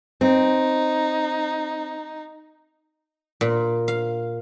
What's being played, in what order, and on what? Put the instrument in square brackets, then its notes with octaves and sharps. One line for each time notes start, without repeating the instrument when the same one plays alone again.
[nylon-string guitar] C4 [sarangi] D#4
[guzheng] A#2
F5